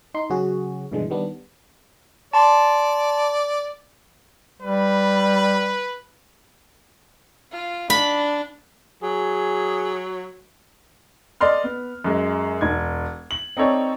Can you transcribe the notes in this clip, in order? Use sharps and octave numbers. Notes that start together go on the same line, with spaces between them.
D#4 C6
C#3 F#3 C#4 F#4 G#4
G2 B2 D3 E3 G#3
D#3 G3 B3 D4
D5 A5 C6
G3 B4
F4
D4 B5
F#3 G#4
A4 D5 D#5 C6 F6
B3
F#2 G#3
E1 G#6
F#7
C4 D#4 A4 C#5 D5